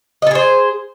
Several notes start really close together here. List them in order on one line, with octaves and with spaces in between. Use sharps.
D#5 A4 G#4 C5